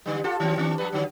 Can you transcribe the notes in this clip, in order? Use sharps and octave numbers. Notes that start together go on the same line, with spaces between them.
D3 G3
F4 G4 A4
D#3 F#3 C4
D#3 C4 D4
F3 G3 B4
D3 F#3